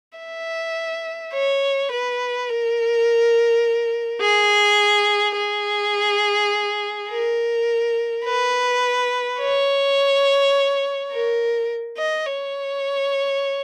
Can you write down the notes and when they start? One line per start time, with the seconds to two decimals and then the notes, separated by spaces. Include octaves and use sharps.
0.19 E5
1.33 C#5
1.91 B4
2.49 A#4
4.22 G#4
5.36 G#4
7.09 A#4
8.25 B4
9.40 C#5
11.12 A#4
11.98 D#5
12.27 C#5